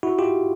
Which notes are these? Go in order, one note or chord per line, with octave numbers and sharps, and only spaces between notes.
E4 F#4
F4 G4